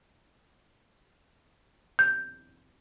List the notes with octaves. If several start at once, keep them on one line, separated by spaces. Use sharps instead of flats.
G6